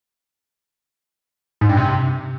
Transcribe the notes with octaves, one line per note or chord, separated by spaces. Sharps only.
G#2
G2
C3